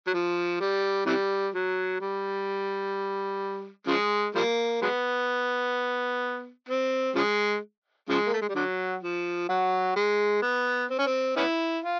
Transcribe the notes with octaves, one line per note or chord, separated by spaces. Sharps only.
F#3
F3
G3
C3 E3 G3
F#3
G3
C#3 F3 G#3
F3 G3 A#3
F#3 G#3 B3
C4
C#3 F3 G#3
C#3 F3 G#3
A#3
A3
G#3
G3
D3 F#3
F3
F#3
G#3
B3
C4
C#4
C4
B3 C#4 E4
F4